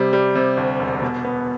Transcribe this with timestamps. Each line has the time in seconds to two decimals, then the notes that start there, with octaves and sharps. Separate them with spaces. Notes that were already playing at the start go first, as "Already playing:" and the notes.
Already playing: C3 G3
0.13 G3
0.35 C3
0.57 D2
0.80 E1
1.02 B2
1.25 B3